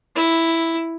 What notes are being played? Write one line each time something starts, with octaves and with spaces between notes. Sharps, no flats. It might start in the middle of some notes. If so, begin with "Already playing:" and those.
E4